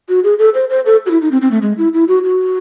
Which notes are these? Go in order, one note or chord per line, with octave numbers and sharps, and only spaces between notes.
F#4
G#4
A4
C5
C5
A4
F#4
E4
D#4
C4
C4
A3
G#3
E4
E4
F#4
F#4